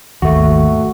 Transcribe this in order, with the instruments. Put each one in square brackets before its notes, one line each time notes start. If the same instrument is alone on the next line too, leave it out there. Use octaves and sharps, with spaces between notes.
[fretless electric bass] G#1 D#2 [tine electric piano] A3 F#4